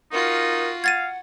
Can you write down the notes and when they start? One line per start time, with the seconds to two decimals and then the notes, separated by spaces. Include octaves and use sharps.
0.12 D#4 F4 F#4 A#4
0.84 F5 F#5 G#6 A6 D#7